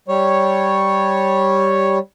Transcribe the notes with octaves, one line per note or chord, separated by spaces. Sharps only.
G3 C#5